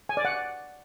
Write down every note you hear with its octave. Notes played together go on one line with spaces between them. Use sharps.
G#5
D5
F#5